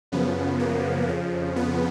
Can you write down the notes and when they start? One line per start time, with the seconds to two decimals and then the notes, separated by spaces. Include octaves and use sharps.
0.12 F#2 C#3 F3 B3
0.60 A#3
1.08 F2 C#3 F3
1.56 B3